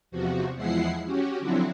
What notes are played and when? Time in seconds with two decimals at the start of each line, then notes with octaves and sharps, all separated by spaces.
0.11 E2 C3 F3 F#4
0.55 E2 F3 G#3 E4 F#5 C7
1.06 C#4 F#4 G4
1.40 D3 F3 F#3 C4 E4 F#4